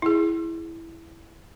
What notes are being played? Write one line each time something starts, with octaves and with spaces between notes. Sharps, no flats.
E4 G#4